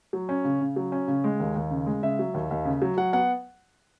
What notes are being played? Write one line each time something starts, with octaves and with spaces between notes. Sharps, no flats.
F#3
C#4
C#3
C#3
F#3
C#4
C#3
G#3
D#2
D#2
C#3
G#3
C#3 E5
F#3
D#2
D#2
C#3
F#3
F#3 F#5
B3 F#5